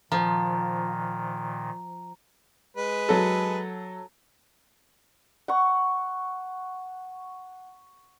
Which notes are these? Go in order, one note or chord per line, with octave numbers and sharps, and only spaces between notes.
A#2 D#3 F3 A#5
G#3 B4
F#3 A4
F#5 C#6